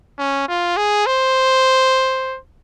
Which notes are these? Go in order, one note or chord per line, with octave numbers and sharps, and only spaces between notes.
C#4
F4
G#4
C5